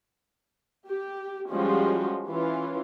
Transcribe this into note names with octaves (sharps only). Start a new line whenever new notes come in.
G4
F3 G3 G#3 C#4 F4 F#4
E3 C#4 F4